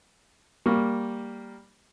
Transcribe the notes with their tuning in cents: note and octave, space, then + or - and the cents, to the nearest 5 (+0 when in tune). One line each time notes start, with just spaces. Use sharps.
G3 +0 A#3 +0 C#6 +0